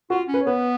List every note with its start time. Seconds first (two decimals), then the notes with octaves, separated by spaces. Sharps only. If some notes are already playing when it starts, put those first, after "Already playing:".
0.10 F4 F#4
0.28 C#4
0.34 B4
0.40 C#5
0.46 B3 B4